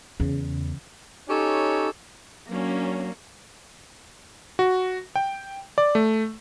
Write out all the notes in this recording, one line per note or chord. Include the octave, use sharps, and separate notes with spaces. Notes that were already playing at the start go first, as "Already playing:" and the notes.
E2 C#3
C#4 D#4 G4 A4 C#5
F#3 A#3 C#4 D4
F#4
G5
D5
A3